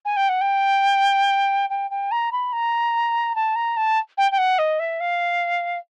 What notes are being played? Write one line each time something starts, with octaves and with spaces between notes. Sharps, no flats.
G#5
G5
F#5
G5
G5
G5
A#5
B5
A#5
A5
A#5
A5
G5
G5
F#5
D#5
E5
F5